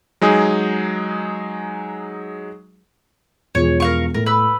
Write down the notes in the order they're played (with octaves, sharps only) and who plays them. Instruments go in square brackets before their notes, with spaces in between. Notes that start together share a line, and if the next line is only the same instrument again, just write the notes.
[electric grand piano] F#3 G#3 D#4 G#4
[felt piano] E1 F3 G#4 [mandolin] C#5
[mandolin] A#4 F5 C#6
[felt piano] A2 [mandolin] A#4
[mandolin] B4 E6